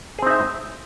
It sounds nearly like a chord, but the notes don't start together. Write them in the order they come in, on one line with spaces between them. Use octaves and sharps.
G#4 C4 D#4 E5